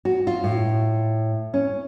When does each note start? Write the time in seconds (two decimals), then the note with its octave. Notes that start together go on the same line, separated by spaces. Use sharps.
0.05 F#4
0.27 F4
0.44 A2
1.54 C#4